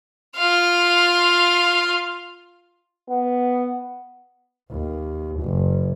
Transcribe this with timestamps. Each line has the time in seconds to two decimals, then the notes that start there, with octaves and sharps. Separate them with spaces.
0.38 F4 F5
3.09 B3
4.71 D#2
5.41 F#1